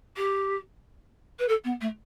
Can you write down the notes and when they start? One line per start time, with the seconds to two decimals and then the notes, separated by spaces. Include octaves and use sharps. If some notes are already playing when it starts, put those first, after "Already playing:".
0.17 G4
1.39 B4
1.48 A4
1.64 B3
1.81 A3